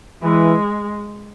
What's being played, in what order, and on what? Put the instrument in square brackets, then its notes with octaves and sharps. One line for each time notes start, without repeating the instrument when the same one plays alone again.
[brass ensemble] E3 [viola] G#3